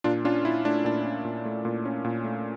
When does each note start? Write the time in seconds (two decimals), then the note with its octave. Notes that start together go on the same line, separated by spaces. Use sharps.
0.04 A#2 D4 F4
0.25 C#4 D4 F4
0.44 A#2 E4
0.65 A3 D4
0.85 A#2 D4
1.05 C#4
1.25 A#2
1.45 A3
1.65 A#2
1.85 C#4
2.05 A#2
2.24 A3